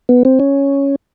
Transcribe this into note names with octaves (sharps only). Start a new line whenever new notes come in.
B3
C4
C#4